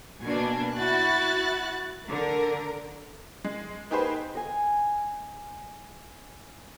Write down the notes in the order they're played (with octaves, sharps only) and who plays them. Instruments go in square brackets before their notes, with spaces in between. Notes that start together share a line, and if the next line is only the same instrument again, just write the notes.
[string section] B2 A#3 D4 [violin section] G#5
[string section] E4 F#4 [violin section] F#6 A6
[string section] D3 [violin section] A#4
[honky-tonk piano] G#3
A#3 D#4 G4 G#4 B4 C5
[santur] D#5 G#5